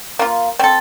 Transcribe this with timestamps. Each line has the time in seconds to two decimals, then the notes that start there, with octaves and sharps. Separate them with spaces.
0.19 A#3 F4
0.59 C4 A4